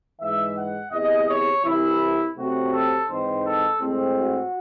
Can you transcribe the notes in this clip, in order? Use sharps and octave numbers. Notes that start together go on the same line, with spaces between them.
G#2 E3 G#3 E5
F#5
E2 C3 E3 D#5
C#5
C2 C3 E3 E4
C3 F#3 A3 C4 F#4
A4
G#2 E3 C4 D#4 C5
A4
A2 G#3 C4
F#4